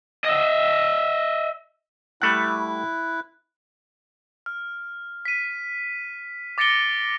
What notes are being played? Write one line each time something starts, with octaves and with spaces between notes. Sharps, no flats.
D#5 E5
G3 A3 E4 F#5 F#6
F6
B6 D#7
D6 A6 A#6 C#7 D7 G7